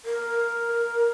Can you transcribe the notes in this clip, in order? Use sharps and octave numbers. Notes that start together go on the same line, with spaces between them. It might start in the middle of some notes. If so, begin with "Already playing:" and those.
A#4